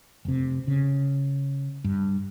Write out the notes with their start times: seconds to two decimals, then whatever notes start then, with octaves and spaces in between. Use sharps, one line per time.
0.25 F1 C3
0.67 C#3
1.84 G2